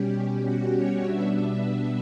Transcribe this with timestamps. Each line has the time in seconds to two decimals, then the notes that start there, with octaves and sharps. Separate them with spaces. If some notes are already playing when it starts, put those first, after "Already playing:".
Already playing: B2 G3 C#4 G4
0.44 F#4
0.74 C#5
1.03 B2 G3 B3 D4 E5
1.63 E5